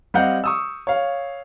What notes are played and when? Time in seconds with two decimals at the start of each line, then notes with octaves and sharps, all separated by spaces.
0.14 G3 C4 D#5 F5 F#5 G6
0.44 C#6 D#6 E6
0.87 C#5 F5